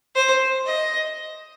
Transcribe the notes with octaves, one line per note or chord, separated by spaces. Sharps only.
C5
D#5